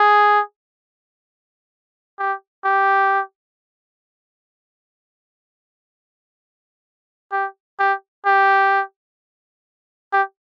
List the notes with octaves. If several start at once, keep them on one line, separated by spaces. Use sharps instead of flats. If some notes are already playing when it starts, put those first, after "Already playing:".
Already playing: G#4
G4
G4
G4
G4
G4
G4